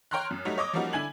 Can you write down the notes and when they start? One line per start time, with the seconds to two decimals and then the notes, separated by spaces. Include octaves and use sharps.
0.11 C#5 G5 A#5 C6 F6 F#6
0.31 F#2
0.45 F#3 G3 A3 D#4
0.58 C#5 D#5 D6 D#6
0.73 F3 G3 A#3 C#4 D#4 F#4
0.93 D3 D4 E4 G#5 G#6 F#7